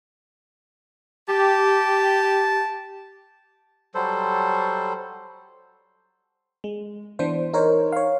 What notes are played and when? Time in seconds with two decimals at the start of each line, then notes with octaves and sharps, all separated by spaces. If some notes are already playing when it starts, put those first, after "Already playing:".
1.29 G4 A5
3.95 F#3 G3 A4 C5
6.64 G#3
7.19 E3 B3 D4 C5
7.53 D#4 A#4 C5 C#5
7.92 C#5 F5